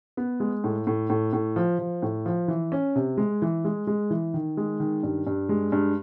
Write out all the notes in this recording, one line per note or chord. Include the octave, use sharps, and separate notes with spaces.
B3
G#3
A2
A2
A2
A2
F3
F3
A2
F3
E3
C#4
C3
G#3
E3
G#3
G#3
E3
D#3
G#3
D#3
G2
G2
G#3
G2